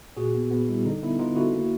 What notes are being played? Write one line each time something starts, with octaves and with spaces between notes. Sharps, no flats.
A#2 F#4 G#4
B3
B3
G3 E4
D3 D#4
B3 E4
B3 D#4 F4
D3 E4 F#4
A#3